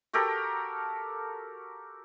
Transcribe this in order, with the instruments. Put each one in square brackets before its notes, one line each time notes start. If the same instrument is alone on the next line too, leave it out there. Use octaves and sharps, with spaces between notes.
[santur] F#4 G4 A4 A#4